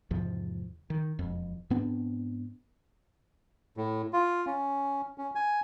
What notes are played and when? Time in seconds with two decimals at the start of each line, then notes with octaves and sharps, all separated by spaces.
0.11 E2 G#2 C3 F3
0.90 D#3
1.19 E1 F2
1.70 G#2 B3 C4 D4
3.77 A2
4.13 F4
4.47 C#4
5.18 C#4
5.35 G#5